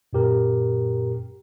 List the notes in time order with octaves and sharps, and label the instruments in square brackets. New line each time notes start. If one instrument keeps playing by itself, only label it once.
[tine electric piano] F#2 A#2 G4 A#4